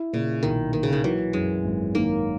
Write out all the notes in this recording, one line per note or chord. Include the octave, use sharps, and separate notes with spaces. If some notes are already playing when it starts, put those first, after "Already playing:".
Already playing: E4
A#2 C#3
B1 D#3
D#3 A#3
C#3
D#3
E3 F#3
F#2 G#3
G#1
D#3 A#3